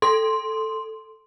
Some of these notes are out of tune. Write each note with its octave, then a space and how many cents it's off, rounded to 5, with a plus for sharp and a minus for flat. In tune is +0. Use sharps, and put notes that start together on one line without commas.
A4 +0 C6 +0